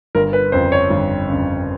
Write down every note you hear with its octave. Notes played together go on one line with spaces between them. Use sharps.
G1 A#4
B4
F2 C#3 C5
C#5
G1
F2 C#3